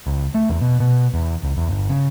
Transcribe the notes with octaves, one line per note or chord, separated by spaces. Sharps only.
C#2
A3
E2
B2
B2
E2
C#2
E2
G1
C#3